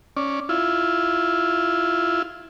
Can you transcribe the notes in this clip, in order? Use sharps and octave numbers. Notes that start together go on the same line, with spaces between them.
C#4 D5
E4 F4